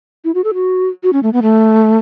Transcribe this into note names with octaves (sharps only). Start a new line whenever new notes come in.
E4
F#4
A4
F#4
F#4
C#4
A3
B3
A3